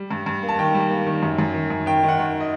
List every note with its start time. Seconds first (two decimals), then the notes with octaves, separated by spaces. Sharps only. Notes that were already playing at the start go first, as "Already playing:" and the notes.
Already playing: G3
0.11 G2
0.26 G2
0.43 A#3
0.48 A5
0.58 D#3 G5
0.74 G3
0.90 A#3
1.07 D#3
1.23 F#2
1.39 F#2
1.54 D#3
1.70 F#2
1.86 D#3 G5
2.03 D#3
2.08 F#5
2.19 D#3
2.40 D#5